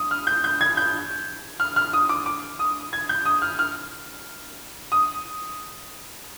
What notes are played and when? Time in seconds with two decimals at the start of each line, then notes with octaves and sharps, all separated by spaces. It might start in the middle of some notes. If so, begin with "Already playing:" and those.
Already playing: D#6
0.11 F6
0.27 G6
0.44 G6
0.61 G#6
0.77 G6
1.60 F6
1.76 F6
1.93 D#6
2.09 D6
2.26 D6
2.59 D#6
2.93 G#6
3.09 G6
3.26 D#6
3.42 F6
3.59 F6
4.92 D#6